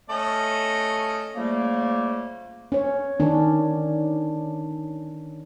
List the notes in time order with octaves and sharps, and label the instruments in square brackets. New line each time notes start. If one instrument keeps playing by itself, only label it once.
[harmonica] A3 C#4 D#5
[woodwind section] C#3 F3 G3 A3 A#3
[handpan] C#4 C#5
D#3 C#4 D4